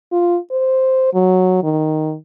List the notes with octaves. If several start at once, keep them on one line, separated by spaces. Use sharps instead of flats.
F4
C5
F#3
D#3